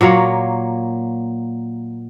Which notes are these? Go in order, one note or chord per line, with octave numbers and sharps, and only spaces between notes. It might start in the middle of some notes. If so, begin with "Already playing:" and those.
A#2 F#3 A#3 C#5